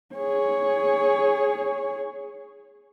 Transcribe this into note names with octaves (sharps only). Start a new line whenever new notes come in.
G#4 C#5